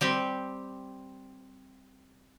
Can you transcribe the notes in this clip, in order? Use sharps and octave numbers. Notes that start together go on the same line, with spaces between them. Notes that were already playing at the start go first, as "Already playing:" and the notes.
G3 C4 G4